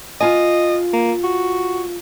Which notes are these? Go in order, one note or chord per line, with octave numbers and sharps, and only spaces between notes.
F4 D#5 G#5
A#3
F#4